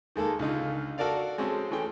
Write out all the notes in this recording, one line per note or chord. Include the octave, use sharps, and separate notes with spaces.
D#3 G#3 A#3 A4
C#2 D3 D#4 F4
F#4 A4 A#4 D5 F5
G#3 C4 C#4 F#4 A4
E3 A3 C#4 G#4 G5